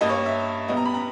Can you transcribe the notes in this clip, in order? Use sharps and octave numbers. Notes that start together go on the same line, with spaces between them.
G2 G3 A#3 D#5
C#5
E5
B2 G3 B3 D#5
A#5
B5
A#5